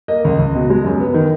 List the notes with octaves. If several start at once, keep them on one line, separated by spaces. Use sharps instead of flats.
A#3 D#5
C#2
C#2
B2
G#3
F#2
B3
D#3